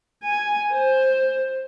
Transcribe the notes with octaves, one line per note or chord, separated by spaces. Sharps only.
G#5
C5